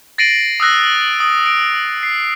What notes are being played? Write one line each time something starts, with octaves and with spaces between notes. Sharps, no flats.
A6 A#6 C7 D7 D#7 F#7
D#6 E6 F#6 A#6
D#6
D7
C7